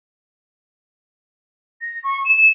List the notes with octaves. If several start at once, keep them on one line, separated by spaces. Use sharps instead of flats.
A#6
C#6
E7